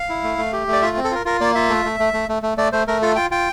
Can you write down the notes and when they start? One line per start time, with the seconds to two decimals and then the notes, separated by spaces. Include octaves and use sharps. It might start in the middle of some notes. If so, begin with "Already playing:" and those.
Already playing: F5
0.09 E4
0.24 A3
0.38 A3
0.53 G4
0.67 A3
0.73 D5
0.82 F4 E5
0.97 C4
1.04 A4
1.11 F4 A#4
1.25 F4 A#4
1.41 A#3 D5
1.55 F4 E5
1.69 A3
1.85 A3
2.00 A3
2.13 A3
2.29 A3
2.43 A3
2.58 A3 D5
2.72 A3 C5
2.88 A3 A#4
3.02 F4 A4
3.16 F4 G5
3.31 F4 G5